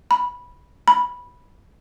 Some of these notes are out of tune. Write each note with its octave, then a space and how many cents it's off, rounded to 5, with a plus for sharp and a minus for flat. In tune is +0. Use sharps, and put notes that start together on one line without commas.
B5 -10
B5 -10